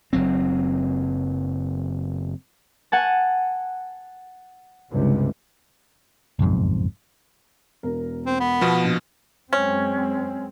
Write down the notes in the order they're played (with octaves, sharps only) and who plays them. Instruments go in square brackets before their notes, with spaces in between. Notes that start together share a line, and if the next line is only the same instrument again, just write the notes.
[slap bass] F#1 F#3 C4
[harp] F#5 G#5 A5
[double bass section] C#2 G2 C3
[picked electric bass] F#1 B1 F2 G#2
[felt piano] E1 A#4
[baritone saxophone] C4
B3
[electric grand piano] B2 F3
[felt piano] A#1
[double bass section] F#2 G#3 C4 [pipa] C#4